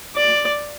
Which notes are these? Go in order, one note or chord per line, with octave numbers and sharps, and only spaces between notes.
D5